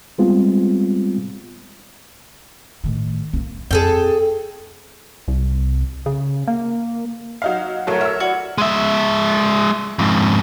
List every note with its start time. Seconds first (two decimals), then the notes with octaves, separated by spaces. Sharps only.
0.18 G3 G#3 B3 C4 F4
2.84 A2 D#3
3.33 A#3 C4
3.71 F2 G#4 A4 G5
5.28 C2
6.06 C#3
6.48 A#3
7.42 F#3 D#4 F5
7.87 C2 F#3 A3 A#4 C#5
8.01 E5 E6 F6
8.20 E4 F#4 D5
8.58 G#3 E5
9.99 F2 G#2